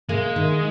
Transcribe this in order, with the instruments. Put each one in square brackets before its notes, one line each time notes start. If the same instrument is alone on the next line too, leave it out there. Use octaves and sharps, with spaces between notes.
[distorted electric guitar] G#3 [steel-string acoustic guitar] A#3
[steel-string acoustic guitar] D#3